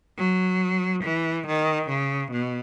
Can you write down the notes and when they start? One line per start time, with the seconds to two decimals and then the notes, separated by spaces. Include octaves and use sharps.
0.18 F#3
1.04 E3
1.47 D#3
1.89 C#3
2.31 B2